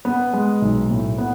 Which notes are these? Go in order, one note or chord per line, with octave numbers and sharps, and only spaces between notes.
B3
G#3
B1
A2
B3